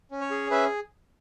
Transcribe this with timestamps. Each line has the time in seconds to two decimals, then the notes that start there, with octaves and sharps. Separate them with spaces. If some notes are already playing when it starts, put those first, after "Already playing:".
0.11 C#4
0.21 C#5
0.31 G#4
0.51 C#4 B4 E5